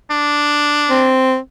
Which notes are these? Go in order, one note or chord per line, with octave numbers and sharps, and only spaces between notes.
D4
C4